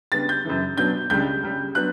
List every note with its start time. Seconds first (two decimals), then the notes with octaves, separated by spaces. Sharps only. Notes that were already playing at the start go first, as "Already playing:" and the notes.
0.12 C#3 G3 B3 D4 A6
0.29 G6
0.45 F#2 C#3 E3
0.77 B2 F#3 B3 D4 G6
1.10 C#2 C#3 G3 D4 G6
1.43 C#2 C#3 G3
1.75 F#3 B3 D4 F#6